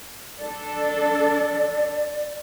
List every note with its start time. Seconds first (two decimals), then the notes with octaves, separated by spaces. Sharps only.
0.39 D4 A4 D5